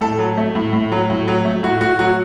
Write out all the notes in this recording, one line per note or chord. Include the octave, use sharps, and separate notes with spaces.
A2 A4
F#3
A3
A2
A2
F#3
A2
F#3
A3
A2 F#4
A2 F#4
F#3 F#4